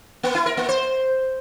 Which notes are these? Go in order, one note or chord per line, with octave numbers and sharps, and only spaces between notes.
A#3
E4
A#4
A#3
C5